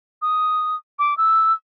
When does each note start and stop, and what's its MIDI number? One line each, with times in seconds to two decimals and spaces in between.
0.22 0.75 87
0.99 1.17 86
1.17 1.53 88